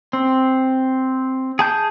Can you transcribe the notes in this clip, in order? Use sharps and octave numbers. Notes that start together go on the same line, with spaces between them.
C4
G#4 A5 G6